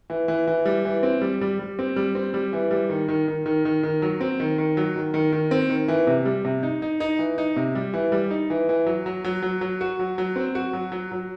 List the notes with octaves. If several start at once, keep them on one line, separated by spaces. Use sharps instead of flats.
E3
E3
E3
G3
E3
C4
G3
G3
G3
C4
G3
C4
G3
E3
G3
D#3
D#3
D#3
D#3
D#3
D#3
F#3
C4
D#3
D#3
F#3
D#3
D#3
D#3
C4
D#3
E3
C3
G3
C3
D#4
D#4
D#4
E3
D#4
C3
G3
E3
G3
D#4
E3
E3
F#3
F#3
F#3
F#3
F#3
F#4
F#3
F#3
C4
F#4
F#3
F#3
F#3